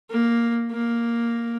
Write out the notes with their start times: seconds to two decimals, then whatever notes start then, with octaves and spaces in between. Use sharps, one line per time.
0.11 A#3
0.71 A#3